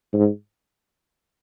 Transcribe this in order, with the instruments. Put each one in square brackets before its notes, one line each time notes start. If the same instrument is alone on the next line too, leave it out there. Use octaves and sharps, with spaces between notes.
[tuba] G#2